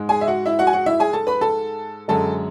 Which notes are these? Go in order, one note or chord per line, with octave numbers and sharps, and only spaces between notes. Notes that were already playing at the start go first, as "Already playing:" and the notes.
Already playing: G#2 G#3
G#4 G#5
E5
F#4 F#5
E4 E5
F#4 F#5
G#5
F#4 F#5
E4 E5
G#4 G#5
A4 A5
B4 B5
A4 A5
F#2 D3 G#3 A4 A5